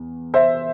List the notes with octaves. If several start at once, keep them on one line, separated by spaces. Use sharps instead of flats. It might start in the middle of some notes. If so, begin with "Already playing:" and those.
Already playing: E2
C5 E5